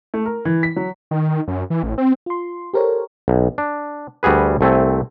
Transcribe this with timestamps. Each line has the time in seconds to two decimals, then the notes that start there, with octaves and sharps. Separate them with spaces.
0.14 A3
0.26 A#4
0.45 E3
0.63 B6
0.76 F#3
1.11 D#3
1.47 F#2
1.70 E3
1.83 A1
1.98 C4
2.26 F4 C6
2.74 G4 A4 A#4 C5 C#5
3.28 B1
3.58 D4
4.23 D2 G3 F#4 G#4 B4
4.61 C2 A3 C4 G#5